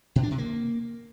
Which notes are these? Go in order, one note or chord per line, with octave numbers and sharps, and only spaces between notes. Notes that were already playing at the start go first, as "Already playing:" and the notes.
B2
D4
C3
A#3